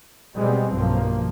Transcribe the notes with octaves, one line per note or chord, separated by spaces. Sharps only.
B2 G3 G#3 B3 C4
B1 G2 F3 A#3